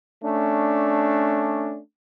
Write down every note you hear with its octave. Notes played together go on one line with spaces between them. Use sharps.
A3 C#4 D4